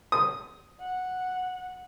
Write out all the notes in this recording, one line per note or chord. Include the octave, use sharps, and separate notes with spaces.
D#6
F#5